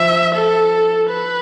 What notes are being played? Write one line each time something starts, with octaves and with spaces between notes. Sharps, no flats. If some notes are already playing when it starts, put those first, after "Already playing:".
Already playing: F3 E5
A4
B4